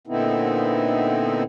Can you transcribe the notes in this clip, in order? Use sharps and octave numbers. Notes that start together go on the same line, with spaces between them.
A#2 D3 B3 C4 D#4 E4